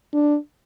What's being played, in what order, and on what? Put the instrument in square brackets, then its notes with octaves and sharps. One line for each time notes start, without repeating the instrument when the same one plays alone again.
[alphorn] D4